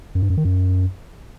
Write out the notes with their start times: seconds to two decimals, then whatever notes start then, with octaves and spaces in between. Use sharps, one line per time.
0.15 F#2
0.23 G2
0.30 F#2
0.37 D#3
0.45 F#2